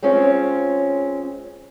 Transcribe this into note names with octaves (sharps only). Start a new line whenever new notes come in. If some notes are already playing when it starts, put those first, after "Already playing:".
G#3 C4 C#4 F4 C#5